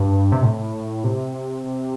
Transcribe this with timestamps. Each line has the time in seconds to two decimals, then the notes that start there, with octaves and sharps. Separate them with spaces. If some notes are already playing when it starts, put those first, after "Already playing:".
Already playing: G2
0.32 C3
0.43 A2
1.04 C3